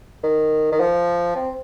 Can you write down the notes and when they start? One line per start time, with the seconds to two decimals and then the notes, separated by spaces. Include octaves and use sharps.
0.23 D#3
0.72 D#3
0.80 F3
1.36 C4